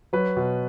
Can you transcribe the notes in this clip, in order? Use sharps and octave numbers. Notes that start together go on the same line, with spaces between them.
F#3 B4
B2